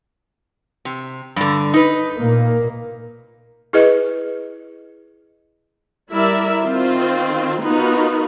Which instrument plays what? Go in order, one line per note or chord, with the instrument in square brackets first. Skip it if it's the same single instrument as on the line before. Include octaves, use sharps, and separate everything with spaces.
[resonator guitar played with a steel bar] C3
G2 D3
D#4 B4
[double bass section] A#2 A#3
[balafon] E4 G#4 B4 D#5
[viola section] G3 E4 A#4 D5 E5
D#3 C4 F4 C5
B3 D#4 F4 F#4 A#4 B4